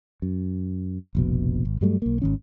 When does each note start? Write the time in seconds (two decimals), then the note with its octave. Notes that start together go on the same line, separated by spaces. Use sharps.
0.22 F#2
1.15 F1 A#1 B2
1.65 G#1
1.81 G2 F#3 G3 A3
2.02 B1 A#3
2.22 G#1 D#3 C#4